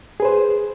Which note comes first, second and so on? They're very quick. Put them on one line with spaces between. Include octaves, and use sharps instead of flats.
G#4 B4 C5